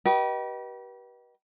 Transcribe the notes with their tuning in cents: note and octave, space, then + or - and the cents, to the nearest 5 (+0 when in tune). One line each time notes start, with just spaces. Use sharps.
G4 -35 B4 -35 D#5 +0